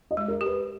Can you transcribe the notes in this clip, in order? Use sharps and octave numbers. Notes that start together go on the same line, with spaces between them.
D#5
G#3
A#4
G4
B4